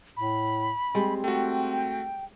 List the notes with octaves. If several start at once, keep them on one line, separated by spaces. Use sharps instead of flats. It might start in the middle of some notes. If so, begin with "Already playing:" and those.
A2 B5
G3 G#3 C4
A3 F#4 G5